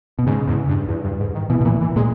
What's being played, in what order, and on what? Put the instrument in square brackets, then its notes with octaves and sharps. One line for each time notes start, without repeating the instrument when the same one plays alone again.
[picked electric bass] B2
[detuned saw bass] G#2 [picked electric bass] C#3
[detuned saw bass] E2
G2
E2
G2
G#2
D#3
[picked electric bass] B2 [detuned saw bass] E3
[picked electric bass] B2
[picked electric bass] A#2 [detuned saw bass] E3
[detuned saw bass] E3
[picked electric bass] A#2 [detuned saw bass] G#3